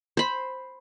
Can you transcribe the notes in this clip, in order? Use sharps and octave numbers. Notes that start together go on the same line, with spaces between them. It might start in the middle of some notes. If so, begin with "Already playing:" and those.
C5 B5